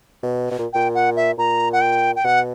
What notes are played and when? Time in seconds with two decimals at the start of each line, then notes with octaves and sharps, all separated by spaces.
0.23 B2
0.51 B2
0.59 A#2
0.73 A#2 G5
0.95 F#5
1.16 E5
1.38 A#2 A#5
1.73 F#5
1.81 G5
2.16 G5
2.25 B2 F#5